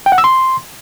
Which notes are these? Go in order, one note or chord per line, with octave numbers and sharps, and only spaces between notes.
G5
F#5
E6
C6